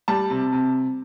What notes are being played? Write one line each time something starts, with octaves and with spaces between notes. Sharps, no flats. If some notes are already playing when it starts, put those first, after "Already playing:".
G3 A5
C3
C3